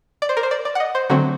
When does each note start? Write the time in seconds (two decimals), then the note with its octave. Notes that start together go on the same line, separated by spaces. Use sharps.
0.22 D5
0.29 C5
0.37 A#4
0.43 C5
0.51 D5
0.65 D5
0.75 F#5
0.80 D#5
0.95 C5
1.10 D3 F#3 A3 C4 F#4